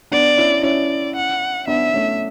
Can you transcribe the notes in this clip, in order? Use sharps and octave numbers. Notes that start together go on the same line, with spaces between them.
B3 D4 D5
C#4 E4
C#4 E4 D5
F#5
B3 D4 E5
A3 C#4